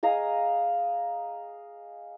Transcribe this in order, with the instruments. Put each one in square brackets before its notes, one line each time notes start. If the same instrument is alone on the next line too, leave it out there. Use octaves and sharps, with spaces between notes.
[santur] G#4 D#5 F5 A#5